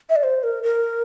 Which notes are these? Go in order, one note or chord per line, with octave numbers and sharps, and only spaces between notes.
E5
D5
C5
A#4
A#4